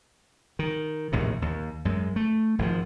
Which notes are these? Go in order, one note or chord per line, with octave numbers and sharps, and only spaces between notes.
D#3
A#1 D#2 A2 C3
D#2
F#2 G#3
A3
G#1 C#3 F3